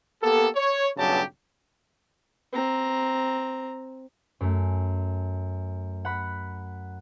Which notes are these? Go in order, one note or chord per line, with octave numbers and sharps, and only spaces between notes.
A#3 B3 G4 A4
C#5
B1 G2 C#3 F#3 G4 A5
C4 A#5
F#2 A3
F#5 B5